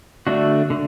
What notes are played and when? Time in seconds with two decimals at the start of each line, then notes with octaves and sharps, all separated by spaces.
0.27 D3 A3 D4 F#4
0.70 D3